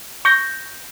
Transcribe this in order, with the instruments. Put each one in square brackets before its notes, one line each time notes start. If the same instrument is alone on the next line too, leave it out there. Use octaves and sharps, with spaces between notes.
[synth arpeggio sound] C#6 G6 A#6